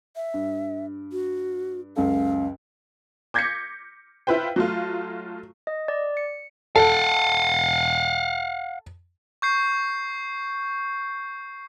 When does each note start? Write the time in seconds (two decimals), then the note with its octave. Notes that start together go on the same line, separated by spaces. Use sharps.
0.16 E5
0.34 G2
1.12 F#4
1.96 C#2 F#2 A4 F5
3.34 D6 G6 G#6 A#6 B6 C#7
4.27 E4 F4 B4 C5 G5
4.56 F#3 A3 F4
5.67 D#5
5.88 D5
6.17 C#7
6.76 A4 F5 F#5
9.42 C#6 G6 C7